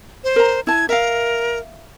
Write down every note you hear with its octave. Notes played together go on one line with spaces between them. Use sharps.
C5
A#4 A#5
E4 A5 G#6
A#4 E5 F5